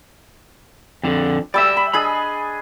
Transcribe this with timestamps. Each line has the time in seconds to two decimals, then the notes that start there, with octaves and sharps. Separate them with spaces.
1.03 F2 D3
1.54 G3 D5 E5 E6
1.77 B5
1.94 D4 G#4 D#5 B5